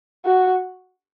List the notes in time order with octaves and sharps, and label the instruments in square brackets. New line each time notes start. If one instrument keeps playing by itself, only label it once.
[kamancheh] F#4